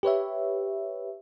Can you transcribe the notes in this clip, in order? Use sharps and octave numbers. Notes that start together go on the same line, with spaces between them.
G4 B4 C#5 E5